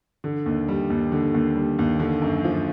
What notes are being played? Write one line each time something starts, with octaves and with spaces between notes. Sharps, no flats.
D3
D#2
G3
D#2
D3
D#2
G3
D#2
D3
F#2
F3